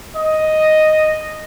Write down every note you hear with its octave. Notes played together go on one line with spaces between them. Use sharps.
D#5